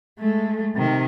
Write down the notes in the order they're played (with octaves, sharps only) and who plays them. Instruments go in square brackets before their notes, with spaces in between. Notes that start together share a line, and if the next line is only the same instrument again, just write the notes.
[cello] G#3 A3
C3 D#3